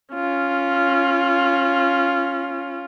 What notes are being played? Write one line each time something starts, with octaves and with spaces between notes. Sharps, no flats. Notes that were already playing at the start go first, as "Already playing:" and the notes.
C#4 F4